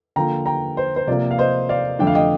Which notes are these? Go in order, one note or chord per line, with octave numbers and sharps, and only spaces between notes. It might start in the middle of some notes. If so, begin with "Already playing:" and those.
D3 F3 A#3 G5 A#5
G5 A#5
C5
C5
C3 F3 A#3 D5
F5
C5 D#5
D5 F5
F2 D3 A3 D4 G5
F5
D#5 G5